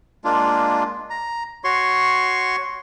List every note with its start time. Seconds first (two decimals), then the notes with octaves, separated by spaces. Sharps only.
0.24 G#3 A#3 D4 F4
1.10 A#5
1.64 F#4 C#5 C6 C#6